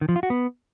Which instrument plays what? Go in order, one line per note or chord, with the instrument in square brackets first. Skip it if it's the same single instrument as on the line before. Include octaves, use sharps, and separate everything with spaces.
[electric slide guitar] D#3
F3
F4
F#4
B3